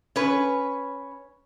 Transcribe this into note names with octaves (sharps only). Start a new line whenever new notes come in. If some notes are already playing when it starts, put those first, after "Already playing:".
C#4 B4